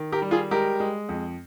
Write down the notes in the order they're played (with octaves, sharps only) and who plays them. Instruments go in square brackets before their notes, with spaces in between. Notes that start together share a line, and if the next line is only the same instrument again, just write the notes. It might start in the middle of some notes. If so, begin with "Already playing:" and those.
Already playing: [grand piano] D#3
G4 A#4
G3
F4 G#4
G#3 G4 A#4
G#3
F2